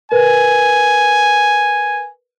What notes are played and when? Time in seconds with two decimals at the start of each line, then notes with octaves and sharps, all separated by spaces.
0.12 A#4 B4 G#5